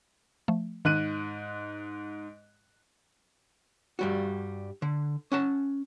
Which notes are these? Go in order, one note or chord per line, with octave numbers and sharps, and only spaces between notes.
F3 A3
G#2 D#3 F#6 D#7
G2 G3 F#4
D3
C#4 F#5 A5